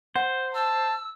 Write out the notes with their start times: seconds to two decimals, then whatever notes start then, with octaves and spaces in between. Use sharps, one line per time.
0.16 C5 F#5
0.55 A5 E6